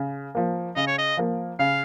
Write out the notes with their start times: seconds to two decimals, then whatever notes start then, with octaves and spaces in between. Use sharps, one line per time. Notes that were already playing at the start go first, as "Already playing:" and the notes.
Already playing: C#3
0.35 F3 A#3
0.76 C#3 D#5
0.87 C#5
0.98 D#5
1.17 F3 A#3
1.59 C#3 F5